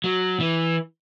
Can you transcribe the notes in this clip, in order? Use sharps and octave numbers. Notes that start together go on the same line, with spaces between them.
F#3
E3